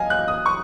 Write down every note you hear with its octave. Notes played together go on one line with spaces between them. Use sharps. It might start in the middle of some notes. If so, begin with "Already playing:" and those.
Already playing: D#5 F5 G#5
F#6
D#6
C#6